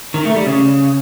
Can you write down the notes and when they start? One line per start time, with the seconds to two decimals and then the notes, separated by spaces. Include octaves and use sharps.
0.14 D#3
0.25 A3
0.36 G3
0.47 C#3